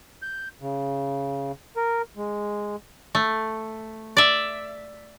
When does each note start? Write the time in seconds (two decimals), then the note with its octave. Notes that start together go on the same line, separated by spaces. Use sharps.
0.22 G6
0.61 C#3
1.76 A#4
2.17 G#3
3.15 A3
4.17 D5 E5